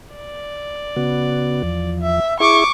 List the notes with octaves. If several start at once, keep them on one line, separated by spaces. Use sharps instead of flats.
D5
C#3 B3 F#4
E2 F3
E5
E4 G#4 E5 C#6 D6